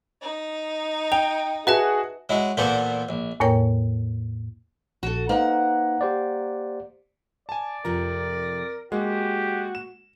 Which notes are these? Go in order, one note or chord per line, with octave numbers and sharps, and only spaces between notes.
D#4
G5 F7
F#4 G#4 B4 E5 A5
F#3 G#3 E4
E2 A#2 A#3 B3 A4 C5
A#1
E2 A2 A#3 A#4 C#5 G5
A#1 F#4 A4
A#3 D#4 B4 C5 F#5
G4 C5 D5
D5 G#5 A5
F2 C3 F3 A#4 A#5
G#3 A#3 F#4 G4
E7